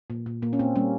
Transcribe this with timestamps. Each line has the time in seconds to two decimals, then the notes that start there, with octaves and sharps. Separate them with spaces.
0.10 A#2
0.26 A#2
0.42 A#2 A#3
0.53 C#4
0.59 A#2 C4
0.75 G3 A#3 C#4